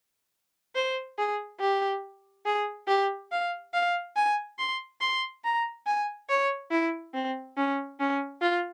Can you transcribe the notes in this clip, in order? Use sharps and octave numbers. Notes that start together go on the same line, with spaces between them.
C5
G#4
G4
G#4
G4
F5
F5
G#5
C6
C6
A#5
G#5
C#5
E4
C4
C#4
C#4
F4